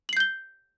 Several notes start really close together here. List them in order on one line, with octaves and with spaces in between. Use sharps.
F#7 C7 G6 G7